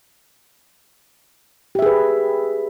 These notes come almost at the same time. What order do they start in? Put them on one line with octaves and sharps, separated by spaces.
G4 E5 G#4 B4